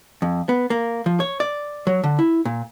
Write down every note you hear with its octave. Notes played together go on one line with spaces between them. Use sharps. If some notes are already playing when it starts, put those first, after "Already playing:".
F2
B3
A#3
F3
C#5
D5
F#3
D3
E4
A#2